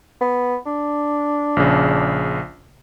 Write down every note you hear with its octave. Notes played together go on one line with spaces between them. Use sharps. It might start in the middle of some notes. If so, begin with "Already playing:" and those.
B3
D4
A#1 C#3